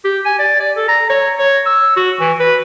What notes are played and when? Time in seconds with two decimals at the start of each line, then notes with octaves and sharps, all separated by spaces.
0.05 G4
0.26 G#5
0.39 D5
0.60 D5
0.77 A4
0.88 A#5
1.10 C#5
1.39 C#5
1.66 E6
1.97 F#4
2.21 E3
2.40 B4